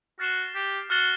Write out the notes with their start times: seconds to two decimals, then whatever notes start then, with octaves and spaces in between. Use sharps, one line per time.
0.19 F#4 F6 A6 C7 E7 G7
0.55 G4
0.90 F#4 F6 A6 C7 E7 G7